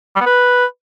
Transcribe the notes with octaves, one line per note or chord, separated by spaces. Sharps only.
G3
B3
B4